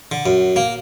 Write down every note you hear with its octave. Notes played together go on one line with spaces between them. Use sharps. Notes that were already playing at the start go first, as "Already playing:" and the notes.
D3
F#2
A#3